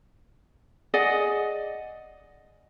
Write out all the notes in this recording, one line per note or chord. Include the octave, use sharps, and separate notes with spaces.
G#4 D5 D#5 F#5